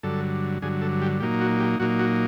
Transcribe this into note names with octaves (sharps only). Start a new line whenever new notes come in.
G2 D3 F#3 A4
G2 D3 F#3 G#4
A4
G4
A#2 F#3 A#3 D#4 G4
F#4
G4
A#2 F#3 A#3 D#4 F#4
F#4